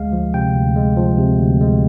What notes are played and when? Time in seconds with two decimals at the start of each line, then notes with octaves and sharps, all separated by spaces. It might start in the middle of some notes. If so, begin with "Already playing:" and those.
Already playing: D2 G#3 F5
0.13 F3
0.34 C3 G5
0.55 D2
0.76 G#3
0.97 F3
1.18 C3
1.39 D2
1.61 G#3